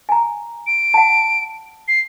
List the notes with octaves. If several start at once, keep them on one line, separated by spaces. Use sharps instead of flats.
G#5 A#5
D7
F#5 G5 A5
C7